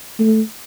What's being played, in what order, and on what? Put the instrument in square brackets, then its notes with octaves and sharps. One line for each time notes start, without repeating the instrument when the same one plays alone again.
[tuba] A3